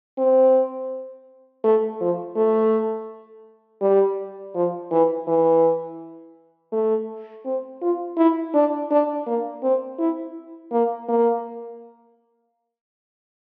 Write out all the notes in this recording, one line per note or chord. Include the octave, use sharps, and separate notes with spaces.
C4
A3
F3
A3
G3
F3
E3
E3
A3
C4
F4
E4
D4
D4
A#3
C4
E4
A#3
A#3